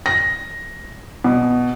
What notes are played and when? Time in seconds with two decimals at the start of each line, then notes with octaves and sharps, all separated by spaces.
0.06 A#6
1.24 B2